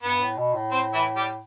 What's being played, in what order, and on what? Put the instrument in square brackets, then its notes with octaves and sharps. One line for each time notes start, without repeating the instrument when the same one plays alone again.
[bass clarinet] G2 [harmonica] B3
[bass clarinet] A2
B2
A2
[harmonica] C4
E3 E4
G3 G4